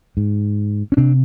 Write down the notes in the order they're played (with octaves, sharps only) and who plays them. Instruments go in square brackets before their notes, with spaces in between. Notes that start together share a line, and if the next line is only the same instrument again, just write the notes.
[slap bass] G#2
C#4
C3 C4 D4